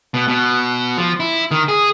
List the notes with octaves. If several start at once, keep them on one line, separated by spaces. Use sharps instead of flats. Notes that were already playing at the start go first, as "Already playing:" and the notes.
B2
B2
F3
E4
D#3
G#4